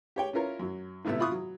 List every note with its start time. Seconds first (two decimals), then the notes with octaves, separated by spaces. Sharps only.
0.16 G4 C#5 G5
0.33 C#4 E4 F4 A#4 C#5
0.60 F#2 F#3
1.05 G#1 A2 C3 A3 B3 E6
1.19 E4 F4 B5 C#6 D#6 F#6
1.32 F#3